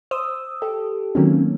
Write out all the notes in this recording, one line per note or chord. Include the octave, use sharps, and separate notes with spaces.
C5 D#6 E6
G4 A4
D#3 F#3 A3 A#3 C4 C#4